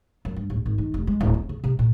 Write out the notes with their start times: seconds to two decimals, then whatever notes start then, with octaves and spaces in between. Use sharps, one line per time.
0.25 F#2
0.36 G2
0.50 D1
0.66 G#1
0.78 D#3
0.94 F1
1.07 G#3
1.21 D1
1.34 C4
1.49 C#3
1.64 C3
1.79 A#2